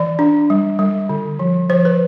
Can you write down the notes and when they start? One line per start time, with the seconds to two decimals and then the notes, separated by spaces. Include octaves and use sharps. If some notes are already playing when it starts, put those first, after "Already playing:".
Already playing: E3 D5
0.19 D4
0.50 G3
0.79 G3
1.09 D3
1.39 F3
1.69 F3 C5
1.85 B4